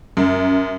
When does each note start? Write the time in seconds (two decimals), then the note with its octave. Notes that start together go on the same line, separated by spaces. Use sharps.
0.17 F#2